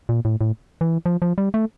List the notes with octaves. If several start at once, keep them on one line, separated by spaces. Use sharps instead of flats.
A#2
A2
A2
E3
F3
F3
G3
A3